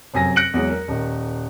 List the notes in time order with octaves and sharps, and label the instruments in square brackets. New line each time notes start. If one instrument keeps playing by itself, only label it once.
[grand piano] F1 F#2 G#5 A#6
F#6 A#6 C#7 D7 F#7
E2 F#3 G#3
A#4
D#1 D#3